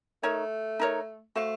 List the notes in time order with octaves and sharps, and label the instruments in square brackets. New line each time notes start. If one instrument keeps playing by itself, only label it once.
[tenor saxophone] A3 [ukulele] D#4 A#4 C#5
[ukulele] D#4 A#4 C#5
[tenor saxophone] A3 [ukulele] F#4 C5 F5